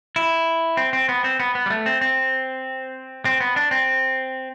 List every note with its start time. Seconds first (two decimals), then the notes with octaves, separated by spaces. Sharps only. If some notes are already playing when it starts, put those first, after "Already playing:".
0.16 E4
0.77 C4
0.93 C4
1.09 B3
1.24 C4
1.40 B3
1.55 B3
1.66 G3
1.70 A3
1.86 C4
2.01 C4
3.25 C4
3.41 B3
3.56 D4
3.71 C4